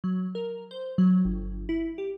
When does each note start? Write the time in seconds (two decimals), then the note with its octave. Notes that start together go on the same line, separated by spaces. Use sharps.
0.04 F#3
0.35 A#4
0.71 C5
0.98 F#3
1.25 G1
1.69 E4
1.98 G4